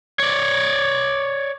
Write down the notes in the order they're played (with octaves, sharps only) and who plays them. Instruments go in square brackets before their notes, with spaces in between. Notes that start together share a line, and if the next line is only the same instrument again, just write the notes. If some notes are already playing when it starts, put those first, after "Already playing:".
[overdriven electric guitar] C#5 D5